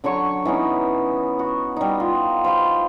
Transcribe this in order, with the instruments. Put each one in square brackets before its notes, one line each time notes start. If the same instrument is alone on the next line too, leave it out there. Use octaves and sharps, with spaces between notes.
[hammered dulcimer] D3 F#3 C#5 C#6
E3 B3 C#4 D#4
F#4
G3 D#4
F4
C5 F5 B5